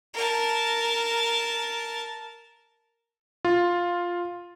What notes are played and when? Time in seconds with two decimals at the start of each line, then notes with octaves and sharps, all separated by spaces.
0.14 A#4 A5
3.45 F4